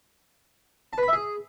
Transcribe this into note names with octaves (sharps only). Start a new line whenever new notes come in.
A5
B4
B5
E5
G#4